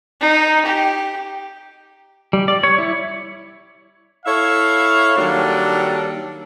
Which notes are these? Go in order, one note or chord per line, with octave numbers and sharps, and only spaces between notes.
D#4
G4
G3
D5
C#5
E4
E4 A4 C#5 E5 F5
D#3 F#3 G3 A#3 D4 A4